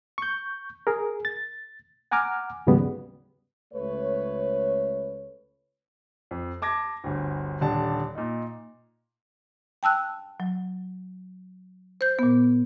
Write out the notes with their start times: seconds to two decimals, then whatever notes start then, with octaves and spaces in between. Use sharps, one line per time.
0.18 C#6 G6
0.87 G#4 A#4
1.25 A6
2.11 F#5 G#5 A#5 D6 F6
2.67 D#2 G#2 C#3 F#3 G3 B3
3.74 C#2 A3 B4 C#5
6.31 F2
6.62 A5 D6 G#6 A#6
7.04 G1 D2
7.61 D#1 D3 D4 A5
8.15 A#2 D#4
9.83 G5 A5 E6 F#6
10.40 F#3
12.01 C5 G6
12.19 A#2 B3